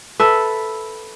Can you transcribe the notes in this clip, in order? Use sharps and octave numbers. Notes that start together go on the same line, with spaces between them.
A4 B4 E5